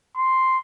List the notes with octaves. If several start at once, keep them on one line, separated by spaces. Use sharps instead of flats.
C6